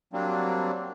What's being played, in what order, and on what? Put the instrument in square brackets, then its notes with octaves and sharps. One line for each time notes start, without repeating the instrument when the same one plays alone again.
[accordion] F#3 G3 A#3 C4 D4